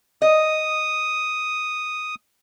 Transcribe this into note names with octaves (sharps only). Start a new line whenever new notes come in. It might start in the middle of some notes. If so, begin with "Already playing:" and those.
D#5 D#6